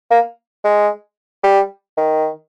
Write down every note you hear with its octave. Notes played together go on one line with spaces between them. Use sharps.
A#3
G#3
G3
D#3